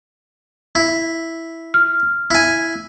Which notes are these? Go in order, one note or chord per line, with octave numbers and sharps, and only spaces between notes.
E4
F6
E4 G#5